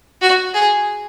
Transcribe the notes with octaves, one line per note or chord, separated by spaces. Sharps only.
F#4
G#4